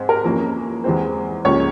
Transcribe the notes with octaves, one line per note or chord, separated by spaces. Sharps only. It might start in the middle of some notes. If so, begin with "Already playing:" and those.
Already playing: G#2 C4
A#4
F2 E3 A#3 C#4
E2 E3 G#3 C4
C#2 C#3 F3 A#3 C#4 C#5